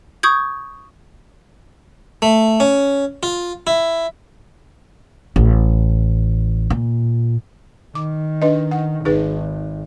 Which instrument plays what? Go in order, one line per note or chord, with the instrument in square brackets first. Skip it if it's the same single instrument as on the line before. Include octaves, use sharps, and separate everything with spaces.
[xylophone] C#6 D#6 G6 G#6
[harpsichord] A3
C#4
F4
E4
[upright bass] A1
A#2
[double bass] D#3 [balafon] D6
[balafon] D4 B4 D#5
F#5
[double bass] G#1 [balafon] D#4 G#4 B4